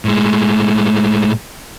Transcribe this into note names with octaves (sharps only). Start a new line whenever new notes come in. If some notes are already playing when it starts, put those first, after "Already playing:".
A2 G#3